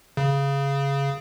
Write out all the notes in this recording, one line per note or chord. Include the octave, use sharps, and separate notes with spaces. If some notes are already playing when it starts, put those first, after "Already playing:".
C#3